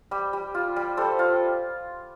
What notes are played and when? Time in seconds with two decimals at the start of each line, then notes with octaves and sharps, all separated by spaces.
0.11 G3 G4
0.33 G3
0.54 F4
0.76 G3
0.97 G3 A4 C5
1.19 F4